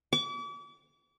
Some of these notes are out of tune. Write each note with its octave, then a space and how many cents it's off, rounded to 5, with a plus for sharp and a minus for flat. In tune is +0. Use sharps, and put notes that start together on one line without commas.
D6 -40